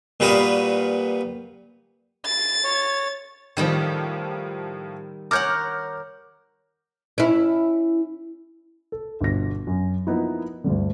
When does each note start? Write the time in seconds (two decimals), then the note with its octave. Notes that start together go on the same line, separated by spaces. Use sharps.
0.20 A#2 G3 F#4 B4 F5 D#6
2.26 A6
2.64 C#5
3.57 A2 D#3 F3 G3 G4
5.31 A#4 C#5 F#5 D6 F6 G6
7.18 C#4 E4
8.92 A4
9.21 G1 B2 A#6
9.67 F#2
10.07 F3 A#3 B3 D#4 E4
10.64 D2 G2 D3